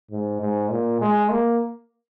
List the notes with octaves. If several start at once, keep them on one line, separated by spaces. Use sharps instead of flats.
G#2
G#2
A#2
G#3
A#3